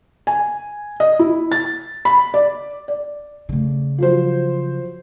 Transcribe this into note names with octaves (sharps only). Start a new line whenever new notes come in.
G#5
D#5
E4
A6
B5
D5
D5
C#3 A3
F3 F#3 C5